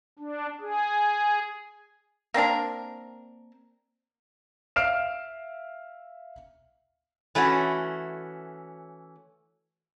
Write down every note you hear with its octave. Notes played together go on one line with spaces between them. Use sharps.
D4
G#4
A#3 C4 D4 A#4
E5 F5 F6 C7 D7 E7
E3 A3 C#4 F#4